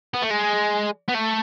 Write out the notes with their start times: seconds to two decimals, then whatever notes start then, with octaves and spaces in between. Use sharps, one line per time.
0.14 B3
0.22 A3
0.31 G#3
1.09 B3
1.15 A3